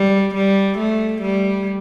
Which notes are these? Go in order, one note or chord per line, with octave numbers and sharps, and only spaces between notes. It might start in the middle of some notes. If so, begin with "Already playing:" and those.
Already playing: G3
G3
A3
G3